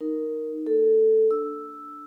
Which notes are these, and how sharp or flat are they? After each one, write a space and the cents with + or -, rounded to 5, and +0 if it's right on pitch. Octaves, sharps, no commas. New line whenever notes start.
D#4 +0 A#4 +0
A#3 -30 A4 +5
D4 +0 E6 +0